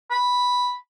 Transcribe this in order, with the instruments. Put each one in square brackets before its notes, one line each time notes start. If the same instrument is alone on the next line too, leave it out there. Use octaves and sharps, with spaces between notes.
[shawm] B5